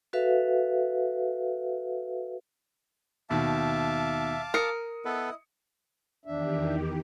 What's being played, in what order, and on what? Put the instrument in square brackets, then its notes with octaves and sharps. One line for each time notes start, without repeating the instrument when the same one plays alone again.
[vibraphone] F#4 A4 B4 E5 F5
[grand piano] D#2 B2 D#3 [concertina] E5 [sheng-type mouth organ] F5 A5 D6
[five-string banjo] A#4 [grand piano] D#6 C#7
[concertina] B3 A4 B4 [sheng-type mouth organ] E4 D#5
[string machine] E2 D#3 G4 [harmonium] D4 E5